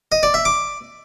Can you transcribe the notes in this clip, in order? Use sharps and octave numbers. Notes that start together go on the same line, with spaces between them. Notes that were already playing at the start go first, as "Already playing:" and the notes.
D#5
D5
E5
D6